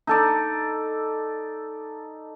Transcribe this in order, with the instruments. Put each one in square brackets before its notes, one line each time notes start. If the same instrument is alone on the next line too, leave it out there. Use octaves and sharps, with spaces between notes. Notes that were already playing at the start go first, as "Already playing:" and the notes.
[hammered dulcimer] D#4 A4 D5